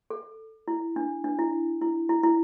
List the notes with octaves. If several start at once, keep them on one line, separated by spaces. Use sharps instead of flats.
A4
E4
D4
D4
E4
E4
E4
E4